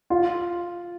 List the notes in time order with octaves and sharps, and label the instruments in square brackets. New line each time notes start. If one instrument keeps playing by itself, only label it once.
[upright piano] F4